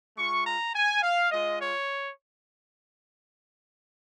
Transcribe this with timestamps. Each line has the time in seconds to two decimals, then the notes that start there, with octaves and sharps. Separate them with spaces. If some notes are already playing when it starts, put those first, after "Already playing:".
0.17 G#3 F4 C#6
0.45 A#5
0.74 G#5
1.03 F5
1.31 G#3 F4 D#5
1.60 C#5